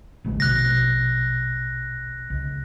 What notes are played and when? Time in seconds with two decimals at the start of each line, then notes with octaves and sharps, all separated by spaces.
0.25 A1 D2 G#3
0.40 A#1 B2 F#6 A#6
2.30 C#2